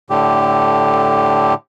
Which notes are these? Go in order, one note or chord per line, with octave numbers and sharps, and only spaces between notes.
A2 D3 G4